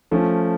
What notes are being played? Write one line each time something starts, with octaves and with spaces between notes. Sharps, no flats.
F3 A3 C#4